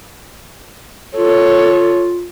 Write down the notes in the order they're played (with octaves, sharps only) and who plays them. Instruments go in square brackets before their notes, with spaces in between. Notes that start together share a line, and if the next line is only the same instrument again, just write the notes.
[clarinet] F4 [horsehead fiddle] A4 C#5